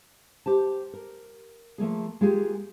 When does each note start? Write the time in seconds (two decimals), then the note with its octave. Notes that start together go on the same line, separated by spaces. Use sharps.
0.46 G4 C5 A5
0.93 A#4
1.78 F3 A3 A#3 G#4
2.21 G#3 A#3 F4 G4 G#4